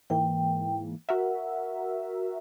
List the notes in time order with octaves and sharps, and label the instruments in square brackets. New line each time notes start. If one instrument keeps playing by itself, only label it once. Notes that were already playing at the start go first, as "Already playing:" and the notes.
[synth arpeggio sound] G#2 E3 A#3 [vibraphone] G5
[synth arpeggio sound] F#4 A#4 E5 [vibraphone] F#5